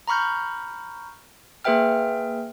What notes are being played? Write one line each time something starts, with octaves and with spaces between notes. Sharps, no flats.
A#5 B5 C#6 F6 G6
A#3 G#4 B4 E5 G5 F6